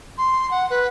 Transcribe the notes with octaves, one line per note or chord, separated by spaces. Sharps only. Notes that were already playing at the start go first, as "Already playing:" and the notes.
C6
F#5
B4